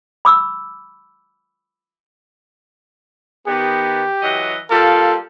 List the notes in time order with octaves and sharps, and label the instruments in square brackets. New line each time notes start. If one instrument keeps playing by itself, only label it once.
[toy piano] B5 D6 E6
[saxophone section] D#3 B3 [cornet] G4
[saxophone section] E3 F#3 D#5
[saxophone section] G3 A#3 F4 [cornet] A4